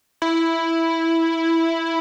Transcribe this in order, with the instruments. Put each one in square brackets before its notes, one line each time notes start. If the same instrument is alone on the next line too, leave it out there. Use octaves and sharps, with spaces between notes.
[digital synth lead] E4